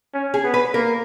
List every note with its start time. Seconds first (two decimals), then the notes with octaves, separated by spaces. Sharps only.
0.13 C#4
0.34 G#4
0.44 B3
0.54 B4
0.74 A#3 A#4